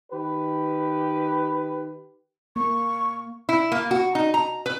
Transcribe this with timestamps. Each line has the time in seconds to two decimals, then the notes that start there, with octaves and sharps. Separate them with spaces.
0.11 D#3 G4 B4
2.56 A#3 C#6
3.49 E4
3.72 A#3
3.91 F#4
4.15 D#4
4.34 A#5
4.66 B4